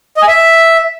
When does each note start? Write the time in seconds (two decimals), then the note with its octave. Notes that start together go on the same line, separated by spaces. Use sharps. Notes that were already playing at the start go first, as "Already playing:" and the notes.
0.17 D#5
0.22 G#5
0.28 E5